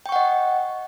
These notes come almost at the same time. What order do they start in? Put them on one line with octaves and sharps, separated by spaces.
G5 C#6 F#5 D#5